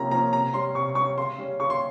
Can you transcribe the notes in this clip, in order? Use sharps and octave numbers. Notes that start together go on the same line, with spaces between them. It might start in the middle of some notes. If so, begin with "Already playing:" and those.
Already playing: C3 F3 A#3 C#4 A#5
F3 A#3 C#4 A#5
C3 A#5
G3 C#4 C6
C3 C#6
G3 C#6
C#4
C#3 C6
G3 C#4
C#3 C#6
C6